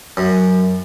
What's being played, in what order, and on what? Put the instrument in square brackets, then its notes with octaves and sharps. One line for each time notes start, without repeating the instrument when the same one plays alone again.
[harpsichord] F#2